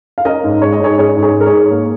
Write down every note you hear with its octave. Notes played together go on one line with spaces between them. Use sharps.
F5
C#4 A#4 D#5
G#2
G#3 C#5
D#5
G#2 G#4 C#5
C#4 G#4 C#5
G#2
G#4 C#5
G#3
A#4
G#4 C#5
G#2
A#3